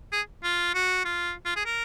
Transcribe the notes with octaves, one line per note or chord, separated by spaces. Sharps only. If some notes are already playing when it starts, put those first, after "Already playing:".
G#4
F4
F#4
F4
F4
G#4
A#4